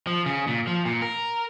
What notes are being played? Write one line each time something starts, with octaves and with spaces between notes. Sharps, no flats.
F3
C#3
A#2
F3
A#2
A#4